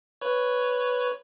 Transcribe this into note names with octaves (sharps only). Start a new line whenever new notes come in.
B4 C#5